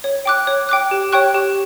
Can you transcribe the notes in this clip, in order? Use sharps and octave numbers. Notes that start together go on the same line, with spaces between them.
C#5
G5 D6 F#6
C#5
G5 D6 F#6
G4
C#5 G5 C#6 F#6
G4